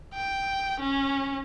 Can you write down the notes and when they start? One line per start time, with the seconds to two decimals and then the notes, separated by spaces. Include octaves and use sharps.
0.14 G5
0.80 C#4